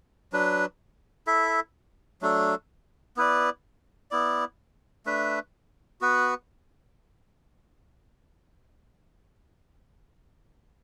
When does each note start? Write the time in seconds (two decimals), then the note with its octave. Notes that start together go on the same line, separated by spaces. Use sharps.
0.33 F#3 D4 B4
1.27 E4 A4 E5
2.22 F#3 A3 D4 A4
3.17 B3 E4 B4 D5
4.11 B3 E4 D5
5.06 A3 D4 B4 E5
6.01 B3 F#4 B4 F#5